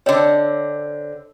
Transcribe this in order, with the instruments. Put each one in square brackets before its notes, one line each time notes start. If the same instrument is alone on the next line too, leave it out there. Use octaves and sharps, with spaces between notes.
[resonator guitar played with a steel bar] D3 C4 [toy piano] C#5 D#5